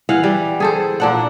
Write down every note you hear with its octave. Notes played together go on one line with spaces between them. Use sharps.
E3 F5 F#5
G3
G#4 A4 C5
A#2 D4 F#5